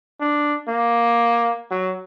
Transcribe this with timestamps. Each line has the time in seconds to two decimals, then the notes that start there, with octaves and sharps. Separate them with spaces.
0.20 D4
0.68 A#3
1.71 F#3